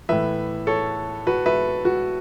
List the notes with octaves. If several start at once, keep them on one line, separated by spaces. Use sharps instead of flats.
A2 E3 B4 E5
A4 C#5
F#4 B4
B4 E5
F#4